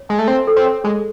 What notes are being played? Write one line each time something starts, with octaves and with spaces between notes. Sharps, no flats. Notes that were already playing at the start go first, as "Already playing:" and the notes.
Already playing: C#5
G#3 G#5
A3
C4 A4
A4
C4
C#5
G#3 G#4